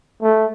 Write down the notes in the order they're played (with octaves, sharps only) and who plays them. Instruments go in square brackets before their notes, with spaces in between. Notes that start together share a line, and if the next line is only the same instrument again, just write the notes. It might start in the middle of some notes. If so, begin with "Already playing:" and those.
[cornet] A3